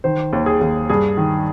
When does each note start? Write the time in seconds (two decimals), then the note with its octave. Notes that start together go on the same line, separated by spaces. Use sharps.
0.04 D#3 C5
0.33 D#2
0.46 G#4
0.61 D#2
0.90 G2 G#4
1.17 D#3